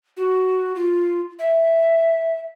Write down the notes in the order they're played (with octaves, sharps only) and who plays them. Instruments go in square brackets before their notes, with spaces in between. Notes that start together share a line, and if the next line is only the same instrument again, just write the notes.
[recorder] F#4
F4
E5